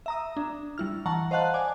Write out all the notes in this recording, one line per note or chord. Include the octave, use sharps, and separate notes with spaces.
E5 A#5 D#6
D4
G3 E4 F6
E3 F#5 A5 A#5 C#6
C5 D#5 F5 F#5 A5 F#6
D5 G#5 D6